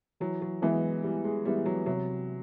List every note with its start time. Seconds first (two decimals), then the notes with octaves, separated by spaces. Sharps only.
0.20 E3 F#3
0.42 F#3
0.62 E3 G#3 B3 E4
1.04 E3 G3
1.25 G#3
1.45 G3 G#3 B3 E4
1.66 F#3
1.86 C3 F#3